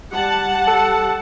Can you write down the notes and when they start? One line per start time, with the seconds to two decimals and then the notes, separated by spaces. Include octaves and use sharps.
0.12 G3 F#5 A5
0.68 A4